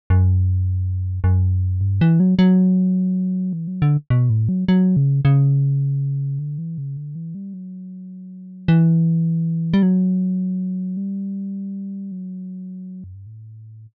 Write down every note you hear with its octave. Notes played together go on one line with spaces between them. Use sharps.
F#2
F#2
G2
E3
F#3
F#3
E3
F#3
D3
B2
A2
F#3
F#3
C#3
C#3
D3
E3
C#3
D3
E3
G3
F#3
E3
G3
F#3
G3
F#3
F#2
G2
A2